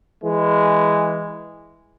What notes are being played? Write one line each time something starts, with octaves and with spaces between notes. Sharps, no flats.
E3 G#3